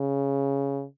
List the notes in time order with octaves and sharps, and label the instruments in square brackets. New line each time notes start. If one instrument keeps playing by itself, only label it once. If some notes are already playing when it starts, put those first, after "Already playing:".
Already playing: [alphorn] C#3